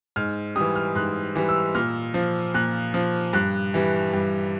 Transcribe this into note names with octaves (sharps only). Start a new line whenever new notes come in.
G#2 F6
E3 G3 D#6
F6
G#2 F#6
E3 G3
E6
A#2 F6
F3
A#2 F#6
F3
G2 F#6
E3 G3
G2